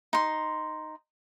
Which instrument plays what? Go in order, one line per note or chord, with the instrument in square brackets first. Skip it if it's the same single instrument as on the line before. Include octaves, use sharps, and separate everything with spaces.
[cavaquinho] D#4 C6